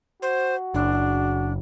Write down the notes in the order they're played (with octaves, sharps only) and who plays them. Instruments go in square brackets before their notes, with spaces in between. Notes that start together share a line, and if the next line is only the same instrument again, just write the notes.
[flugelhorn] F#4 [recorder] C5
[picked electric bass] F#1 [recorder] D4